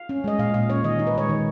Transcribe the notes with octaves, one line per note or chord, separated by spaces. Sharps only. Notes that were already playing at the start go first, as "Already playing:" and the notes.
Already playing: F5
C#4
G#3 D#5
A#2 F5
A#2 F5
C#4 C#5
D#3 D#5
D#4
B4
G#3 C#5
D#3